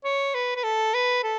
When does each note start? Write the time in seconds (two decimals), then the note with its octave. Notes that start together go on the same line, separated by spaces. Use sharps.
0.04 C#5
0.34 B4
0.56 B4
0.63 A4
0.94 B4
1.23 A4